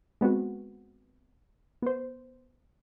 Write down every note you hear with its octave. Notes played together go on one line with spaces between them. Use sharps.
G#3 B3 C4 F#4
B3 C5